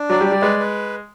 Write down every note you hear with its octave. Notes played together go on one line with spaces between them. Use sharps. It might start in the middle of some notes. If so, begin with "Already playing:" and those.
Already playing: D4
F#3 D5
G3
D5
G3
G#3 B4
B4